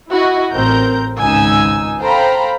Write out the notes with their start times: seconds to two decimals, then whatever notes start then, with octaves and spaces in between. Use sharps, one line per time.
0.11 E4 F#4 D#5
0.51 A1 C4 A#4 A#5 G6
1.19 G#1 C#2 D#4 G#5 E6
2.00 A4 C5 F5 G5 A#5 B5